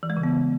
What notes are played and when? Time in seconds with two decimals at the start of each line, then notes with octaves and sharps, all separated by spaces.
0.03 E3
0.10 G#3
0.17 C#3
0.23 B3